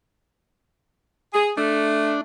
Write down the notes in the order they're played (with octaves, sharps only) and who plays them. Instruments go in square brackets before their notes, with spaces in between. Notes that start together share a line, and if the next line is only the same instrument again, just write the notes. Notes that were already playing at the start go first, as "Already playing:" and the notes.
[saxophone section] G#4
[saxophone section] A3 [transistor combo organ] D4